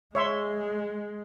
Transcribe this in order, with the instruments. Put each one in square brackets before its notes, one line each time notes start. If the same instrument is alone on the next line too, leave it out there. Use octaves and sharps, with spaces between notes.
[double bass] G#3 [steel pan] C#5 E5 C6